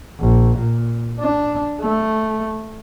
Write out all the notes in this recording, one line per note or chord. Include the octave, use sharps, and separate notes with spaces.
A#1
A#2
D4
A3